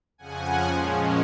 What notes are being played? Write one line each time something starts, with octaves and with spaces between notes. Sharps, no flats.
F2 C#3 F3 F#5 G#5
A#2 F3 G#3 C#4